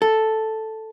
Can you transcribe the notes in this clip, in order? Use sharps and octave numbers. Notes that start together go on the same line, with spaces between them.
A4